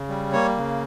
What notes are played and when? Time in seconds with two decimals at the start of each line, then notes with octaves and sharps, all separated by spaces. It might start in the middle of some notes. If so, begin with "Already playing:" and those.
Already playing: C#3
0.09 G3
0.33 A#3 C#5
0.57 C#3